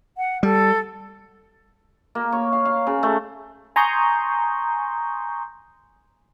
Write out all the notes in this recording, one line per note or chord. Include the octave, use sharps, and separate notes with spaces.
F#5
G3 A4
A#3
C#5
F5
F5
C#3
A3
G#5 A#5 C6 C#6 D#6 G6